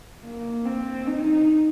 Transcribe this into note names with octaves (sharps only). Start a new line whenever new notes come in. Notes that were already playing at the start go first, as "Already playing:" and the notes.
A#3
C4
D#4